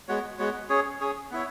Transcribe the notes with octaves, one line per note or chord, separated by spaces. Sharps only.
G#3 B3 F#4 C#5
G#3 B3 F#4 C#5
C#4 G#4 C#5
C#4 G#4 C#5
B3 E4 C#5